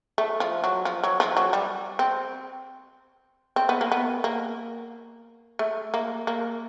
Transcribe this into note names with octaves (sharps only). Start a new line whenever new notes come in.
A3
F3
F#3
F3
F#3
F3
F#3
G3
C4
C4
B3
A#3
B3
A#3
A3
A#3
A#3